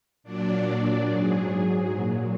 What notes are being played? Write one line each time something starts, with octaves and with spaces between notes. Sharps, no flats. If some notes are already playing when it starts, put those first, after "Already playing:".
A#2 F#3 D4 D5
G#2 F#3 G#4
A#2 F#3